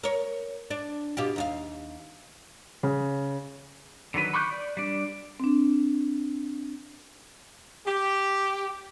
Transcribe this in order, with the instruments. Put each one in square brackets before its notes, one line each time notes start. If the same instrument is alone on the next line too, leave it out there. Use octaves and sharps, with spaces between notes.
[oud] A#4 C#5
D4
B2 F4 G4
D#2 F4 F5
[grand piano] C#3
[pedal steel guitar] D3 D#3 F#3 B4
B5 C#6 D6 F#6 G6
D5
G3 D4
[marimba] C4 D4
[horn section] G4